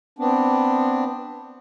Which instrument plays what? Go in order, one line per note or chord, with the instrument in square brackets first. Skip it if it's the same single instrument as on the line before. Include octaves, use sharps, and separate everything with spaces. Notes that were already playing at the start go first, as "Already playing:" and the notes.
[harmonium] B3 C4 D4